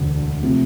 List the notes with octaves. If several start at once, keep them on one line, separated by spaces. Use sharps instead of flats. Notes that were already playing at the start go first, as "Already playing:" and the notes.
Already playing: E1 D2 D3
C3 F3 A3